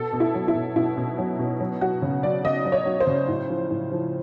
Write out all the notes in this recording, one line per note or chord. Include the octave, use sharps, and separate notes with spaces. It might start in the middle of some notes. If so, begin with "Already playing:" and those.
Already playing: B2 A4
B2
E4
F#3
E4
B2
B2 E4
B2
F#3
B2
F#3
F#3 F#4
C#3
F#3 D5
C#3 D#5
F#3
C#5
F#3
C5
C#3
A2
F3
A2
F3